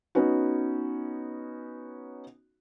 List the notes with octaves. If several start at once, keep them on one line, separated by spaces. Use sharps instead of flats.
B3 C#4 D#4 F#4